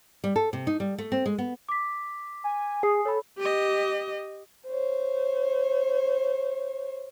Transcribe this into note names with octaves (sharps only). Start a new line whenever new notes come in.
G3
A4
C3
D#4
G3
A3
C4
G#3
B3
D6 B6
G#5
G#4 G#5 D#6 C7
A4 C#5 B5
G4 D#5
C5 C#5